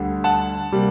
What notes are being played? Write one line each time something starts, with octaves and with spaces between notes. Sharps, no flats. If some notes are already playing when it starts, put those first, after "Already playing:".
Already playing: D2 D3 G3
F#5 A5
C3 G3 A#3